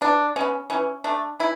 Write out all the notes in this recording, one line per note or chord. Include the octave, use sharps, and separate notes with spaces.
E3 D4
G#3 B3 C#4
E3 C#4
A3 D4
E3 E4